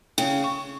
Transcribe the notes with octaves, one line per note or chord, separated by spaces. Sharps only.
C#3 G5
C#6